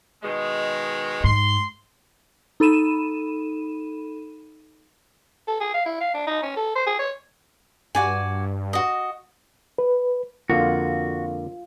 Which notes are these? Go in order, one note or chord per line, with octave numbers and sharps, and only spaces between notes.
B2 D#3 G#3
G#2 C6
D#4 A4 B5 D#7 E7
A4
G#4
F5
E4
F5
D4
D#4
C#4
A4
C5
G#4
C#5
G2 F#4 D5 G#5
F#4 D#5
B4
F2 D3 A#3 F4 F#4